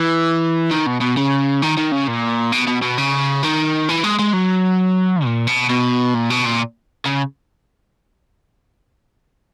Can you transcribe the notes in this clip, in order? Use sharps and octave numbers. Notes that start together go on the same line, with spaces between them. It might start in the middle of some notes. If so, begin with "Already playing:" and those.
Already playing: E3
D#3
B2
B2
C#3
D#3
D#3
C#3
A#2
B2
B2
B2
C#3
D#3
E3
G#3
G#3
F#3
A#2
B2
B2
A#2
B2
A#2
C#3